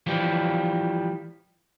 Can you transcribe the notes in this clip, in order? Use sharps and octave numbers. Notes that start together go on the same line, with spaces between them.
E3 F3 G3